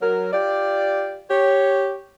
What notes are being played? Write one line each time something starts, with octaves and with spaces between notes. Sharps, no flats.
F#3 A#4
F4 G4 D5
G4 C#5